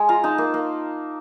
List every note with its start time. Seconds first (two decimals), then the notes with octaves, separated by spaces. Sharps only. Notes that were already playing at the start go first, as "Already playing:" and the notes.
Already playing: G#3
0.09 F4 A#5
0.24 D#4 A5
0.38 A#3
0.54 A#3